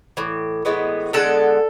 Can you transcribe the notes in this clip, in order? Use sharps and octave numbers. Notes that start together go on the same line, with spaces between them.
A2 E3
A2 E3 G#3 B3
D3 G#3 B3 A4 A5